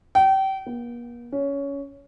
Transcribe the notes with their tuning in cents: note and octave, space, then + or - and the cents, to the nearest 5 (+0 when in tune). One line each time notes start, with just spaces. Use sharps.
G5 -30
A#3 +45
C#4 +15